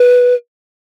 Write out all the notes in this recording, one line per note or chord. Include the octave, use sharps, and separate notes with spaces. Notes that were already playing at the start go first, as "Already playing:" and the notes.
Already playing: B4